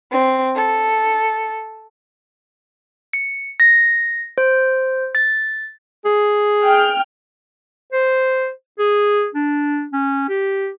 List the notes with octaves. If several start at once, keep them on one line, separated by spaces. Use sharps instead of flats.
C4
A4
C#7
A#6
C5
A6
G#4
G5 F6
C5
G#4
D4
C#4
G4